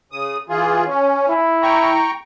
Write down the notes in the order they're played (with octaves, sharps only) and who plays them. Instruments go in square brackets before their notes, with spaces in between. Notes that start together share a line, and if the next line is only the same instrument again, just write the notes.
[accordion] C#3 D#6
E3 F4 G#4
[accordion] C#4 [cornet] C#5
[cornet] E4
[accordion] G5 A#5 C#6